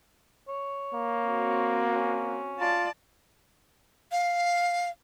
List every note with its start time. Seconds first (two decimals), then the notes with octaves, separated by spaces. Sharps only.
0.48 C#5
0.94 A#3
1.27 C4 F#4
1.95 C#4
2.60 F4 D5 A5
4.12 F5